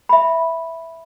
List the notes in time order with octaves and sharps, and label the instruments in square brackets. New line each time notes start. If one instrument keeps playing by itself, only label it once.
[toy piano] E5 B5